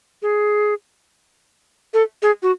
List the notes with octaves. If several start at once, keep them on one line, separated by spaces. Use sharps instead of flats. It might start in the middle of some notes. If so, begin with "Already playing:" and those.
G#4
A4
G#4
F#4